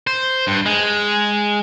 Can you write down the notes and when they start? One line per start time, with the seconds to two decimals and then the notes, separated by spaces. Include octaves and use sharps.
0.07 C5
0.47 G2
0.66 G#3